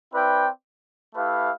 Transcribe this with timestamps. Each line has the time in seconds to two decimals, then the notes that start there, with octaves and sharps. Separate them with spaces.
0.13 C4 E4 B4 D5 G5
1.15 A3 E4 G4 B4 F5